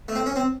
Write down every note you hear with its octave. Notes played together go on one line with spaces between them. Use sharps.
A3
C4
C#4
C4